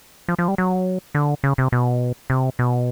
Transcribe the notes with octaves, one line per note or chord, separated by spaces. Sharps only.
F3
F3
G3
F#3
D3
C#3
C3
B2
C3
B2